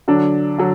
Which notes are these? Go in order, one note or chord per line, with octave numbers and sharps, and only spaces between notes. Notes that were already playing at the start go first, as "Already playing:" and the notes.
D3 F#3 D4
D3 F#3